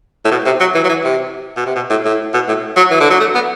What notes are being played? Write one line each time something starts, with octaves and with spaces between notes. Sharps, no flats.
A2
B2
C3
F#3
E3
F#3
E3
C3
B2
C3
B2
A2
A2
B2
A2
F#3
E3
D3
F#3
A3
B3